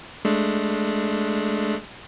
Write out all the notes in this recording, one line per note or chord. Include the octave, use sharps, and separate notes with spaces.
G#3 A3 D4